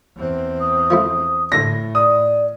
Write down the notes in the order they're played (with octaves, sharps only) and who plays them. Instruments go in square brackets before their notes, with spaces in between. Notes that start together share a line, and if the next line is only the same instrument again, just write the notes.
[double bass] E2 C4
[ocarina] D#6
[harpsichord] F3 A3 E4
[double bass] A2 [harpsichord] D3 D4 [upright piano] A#6
[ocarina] D5 [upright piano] D#6